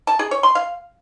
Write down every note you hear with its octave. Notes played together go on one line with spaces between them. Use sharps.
A5
G#4
C#5
C6
F5